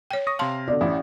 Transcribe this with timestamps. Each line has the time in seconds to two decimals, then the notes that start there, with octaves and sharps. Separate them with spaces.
0.11 C#5 G5
0.27 C#6 D#6 A#6
0.39 C3 F5 A5 C6
0.68 B2 D3 D5
0.81 A1 E4